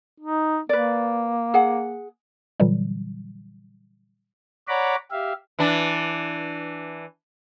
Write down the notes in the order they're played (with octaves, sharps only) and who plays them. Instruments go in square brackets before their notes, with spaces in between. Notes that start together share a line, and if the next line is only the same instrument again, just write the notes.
[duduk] D#4
[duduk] A#3 [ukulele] B4 D5
[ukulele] G#4 F#5
[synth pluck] A#2 D3 E3 F#3 G3
[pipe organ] C#5 D5 F#5 A#5 B5 D6
G4 E5 F5
[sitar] E3 D4